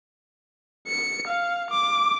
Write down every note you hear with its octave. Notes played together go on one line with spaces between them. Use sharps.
C#7
F5
D6